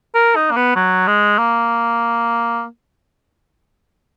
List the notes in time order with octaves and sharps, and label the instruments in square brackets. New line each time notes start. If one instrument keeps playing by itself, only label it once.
[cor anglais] A#4
D#4
A#3
B3
F#3
G#3
A#3